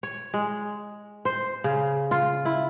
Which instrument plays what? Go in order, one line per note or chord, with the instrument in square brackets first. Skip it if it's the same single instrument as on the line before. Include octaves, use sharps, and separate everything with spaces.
[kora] C#5
G#3
C5
C#3
F4
E4